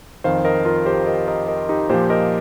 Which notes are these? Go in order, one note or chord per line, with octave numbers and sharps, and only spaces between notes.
F2 D#3 C5 F5
A#4 D#5
F4 A#4
G4 C5
A#4 D#5
A#4 D#5
A#4 D#5
D#4 G4
A#2 F3 G4 C5
A#4 D#5